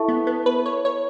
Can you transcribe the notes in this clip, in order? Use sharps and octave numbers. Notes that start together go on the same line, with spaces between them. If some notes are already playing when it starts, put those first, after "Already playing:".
Already playing: E4 A4 E5 A5 C#6
B3
B3
B4
C#5
C#5